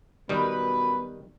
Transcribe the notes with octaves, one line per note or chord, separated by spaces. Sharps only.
F#2 B2 D#3 G3 B3 B4